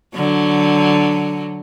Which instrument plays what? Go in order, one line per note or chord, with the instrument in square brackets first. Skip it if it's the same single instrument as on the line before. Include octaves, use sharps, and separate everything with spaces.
[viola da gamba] D3 F#3